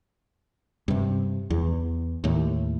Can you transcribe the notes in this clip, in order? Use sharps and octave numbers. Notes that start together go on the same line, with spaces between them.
G2 C3
E2
D#2 A2